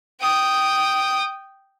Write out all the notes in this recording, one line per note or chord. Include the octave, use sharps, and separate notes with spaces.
G5 D#6